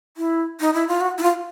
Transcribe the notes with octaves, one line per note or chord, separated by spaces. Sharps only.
E4
D#4
E4
F4
F#4
E4
F4